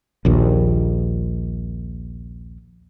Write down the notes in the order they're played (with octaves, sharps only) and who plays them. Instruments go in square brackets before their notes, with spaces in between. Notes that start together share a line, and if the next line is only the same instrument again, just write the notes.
[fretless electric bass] A#1 D#2